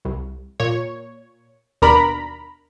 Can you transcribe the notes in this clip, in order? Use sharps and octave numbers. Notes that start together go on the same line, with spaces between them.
C2
A#2 C#5
D#2 B2 D4 A#4 A#5 B5